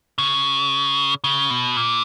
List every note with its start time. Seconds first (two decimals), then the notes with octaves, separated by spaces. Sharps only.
0.18 C#3
1.24 C#3
1.50 B2
1.77 A#2